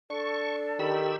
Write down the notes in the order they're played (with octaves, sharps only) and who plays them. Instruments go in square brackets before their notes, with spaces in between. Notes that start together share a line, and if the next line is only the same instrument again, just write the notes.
[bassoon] D4 [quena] A4 [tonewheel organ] C#6
[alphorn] D#3 [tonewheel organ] G4 B5 E6